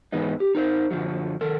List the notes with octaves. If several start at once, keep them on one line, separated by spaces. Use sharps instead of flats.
G#2 E3 G#3 B3 D#4
G4
D#4 A#4 C5
F#2 D3 F3 F#3
D#3 A4 A#4